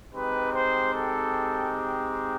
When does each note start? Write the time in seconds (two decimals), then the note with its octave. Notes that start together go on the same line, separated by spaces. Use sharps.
0.12 G#3 C4 D#4 G4 B4
0.52 C5
0.93 A4